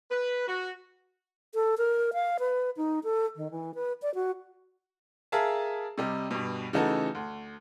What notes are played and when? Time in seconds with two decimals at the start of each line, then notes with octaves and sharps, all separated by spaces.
0.11 B4
0.48 F#4
1.55 A4
1.78 A#4
2.13 F5
2.40 B4
2.77 D#4
3.04 A4
3.36 D#3
3.51 E3
3.75 B4
4.02 D5
4.15 F#4
5.32 G#4 A#4 E5 F5 A5
5.98 C3 G3 D#5
6.31 G2 B2
6.73 C#3 E3 A3 D#4 F#4 A4
7.15 D2